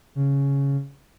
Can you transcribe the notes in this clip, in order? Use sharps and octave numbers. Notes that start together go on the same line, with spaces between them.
C#3